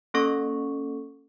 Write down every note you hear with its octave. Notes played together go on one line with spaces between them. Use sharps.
A#3 C#4 A4 C#6